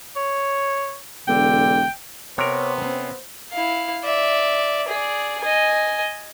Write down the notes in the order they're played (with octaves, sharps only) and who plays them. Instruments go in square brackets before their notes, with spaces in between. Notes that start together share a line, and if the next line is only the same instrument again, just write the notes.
[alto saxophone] C#5
[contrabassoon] E1 [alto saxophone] D3 [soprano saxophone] G5
[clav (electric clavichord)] C3 A#4 [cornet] B3 [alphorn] C5 [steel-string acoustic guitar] C#5
[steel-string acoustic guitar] C4 C#4
[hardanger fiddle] E4 F5
D5 E5
G#4 D5
D#5 G#5